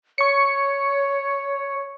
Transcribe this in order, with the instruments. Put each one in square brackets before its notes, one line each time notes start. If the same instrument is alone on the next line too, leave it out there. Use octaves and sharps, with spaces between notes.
[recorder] C#5 [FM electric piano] C#6 C#7